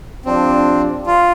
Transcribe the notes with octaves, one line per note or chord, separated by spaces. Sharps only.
C3 F3 C4 D4
F4